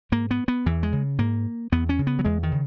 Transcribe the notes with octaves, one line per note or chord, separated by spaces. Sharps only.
G#2 A#3
B3
B3
E2 E3
G#3
C#3
G#2 A#3
E2 B3
C#4
C#3
B3
F#3
E2 G#3
D#3
C#3